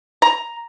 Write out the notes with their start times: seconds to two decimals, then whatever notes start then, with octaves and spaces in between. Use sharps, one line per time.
0.22 A#5